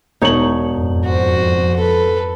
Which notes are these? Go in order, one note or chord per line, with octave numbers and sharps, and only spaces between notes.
E1 D#4 C#5 F#7
F2 G#2
F#4 C5
A4 B4